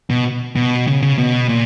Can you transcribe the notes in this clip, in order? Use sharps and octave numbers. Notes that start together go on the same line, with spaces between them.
B2
B2
C#3
C#3
B2
A#2